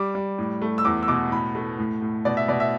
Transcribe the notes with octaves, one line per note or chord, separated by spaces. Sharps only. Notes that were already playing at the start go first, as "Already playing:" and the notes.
Already playing: G3 D6
G3
A2
A3
E6
E2 D6
E6
B2 D6
A2 B5
A3
A2
A2
B2 D5
E5
B2 D5
E5